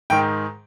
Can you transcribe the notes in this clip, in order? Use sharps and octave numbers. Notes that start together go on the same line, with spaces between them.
G#2 D#3 G#3 G5